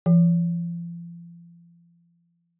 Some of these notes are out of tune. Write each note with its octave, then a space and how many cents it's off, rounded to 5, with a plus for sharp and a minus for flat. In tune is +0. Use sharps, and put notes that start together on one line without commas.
F3 -40